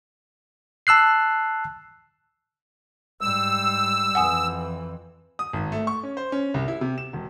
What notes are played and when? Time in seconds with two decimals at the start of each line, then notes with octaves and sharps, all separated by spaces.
0.87 A5 E6 F#6 C7
3.21 G#2 G3 E6
4.15 F2 E3 F#5 G#5 D#6
5.39 D#6
5.53 G#1
5.72 A3
5.87 C#6
6.03 C#4
6.17 C5
6.32 C#4
6.54 C2
6.68 E4
6.81 C3
6.98 E7
7.13 E1